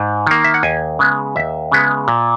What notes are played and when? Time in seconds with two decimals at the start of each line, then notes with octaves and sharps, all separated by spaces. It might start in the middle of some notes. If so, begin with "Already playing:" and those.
Already playing: G#2
0.27 D#3 A#3
0.44 E5
0.54 F#5
0.63 D#2 G#5
0.99 C#3 G#3 B3
1.36 D#2 E5
1.72 C#3 G#3 B3
2.08 A#2